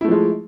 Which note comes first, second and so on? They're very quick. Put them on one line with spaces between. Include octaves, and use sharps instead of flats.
E4 A3 F3 G#3